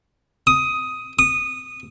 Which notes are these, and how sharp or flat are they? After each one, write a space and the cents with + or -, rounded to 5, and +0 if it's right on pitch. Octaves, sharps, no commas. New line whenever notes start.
D#6 +10
D#6 -15